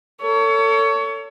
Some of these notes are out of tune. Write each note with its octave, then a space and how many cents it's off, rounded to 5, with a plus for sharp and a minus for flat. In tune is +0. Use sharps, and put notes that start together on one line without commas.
A4 +35 C#5 +25